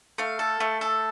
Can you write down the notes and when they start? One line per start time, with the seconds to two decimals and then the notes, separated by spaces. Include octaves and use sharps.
0.18 A3 F5
0.39 A4
0.60 A3
0.81 A4